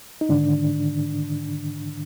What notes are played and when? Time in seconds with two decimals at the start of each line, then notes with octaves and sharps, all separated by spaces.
0.21 D#4
0.29 G#2 D3 D#3 D4